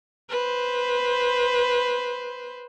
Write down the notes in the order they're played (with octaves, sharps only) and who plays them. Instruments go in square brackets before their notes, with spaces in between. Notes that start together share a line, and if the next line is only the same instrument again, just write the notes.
[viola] B4 C5